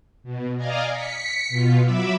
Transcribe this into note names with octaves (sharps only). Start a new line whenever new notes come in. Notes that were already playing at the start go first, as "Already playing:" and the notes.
B2
D5 D#5 F5 G#5 A#5
B6 C#7
B2 F4
F#3 E5 B5 D6 E6